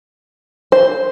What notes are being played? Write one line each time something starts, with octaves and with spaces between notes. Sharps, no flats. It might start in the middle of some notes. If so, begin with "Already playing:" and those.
C5